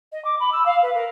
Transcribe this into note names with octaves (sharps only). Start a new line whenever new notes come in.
D#5
D6
B5
E6
F5
B4
A#4